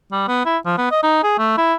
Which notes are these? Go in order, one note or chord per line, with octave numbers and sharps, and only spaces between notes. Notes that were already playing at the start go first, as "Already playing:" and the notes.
G3
B3
E4
F3
B3
D#5
D#4
G#4
A3
E4